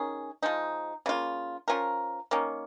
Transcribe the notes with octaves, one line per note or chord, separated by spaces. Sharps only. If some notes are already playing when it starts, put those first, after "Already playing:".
Already playing: D#3 C#4 G#4
F3 G#3 D#4
C#3 A#3 F4
F3 C#4 F4 A#4
D#3 A#3 C#4